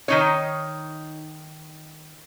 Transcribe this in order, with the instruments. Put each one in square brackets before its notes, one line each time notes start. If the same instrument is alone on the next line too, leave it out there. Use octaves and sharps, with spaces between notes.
[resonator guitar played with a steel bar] D#3 D#4 C#5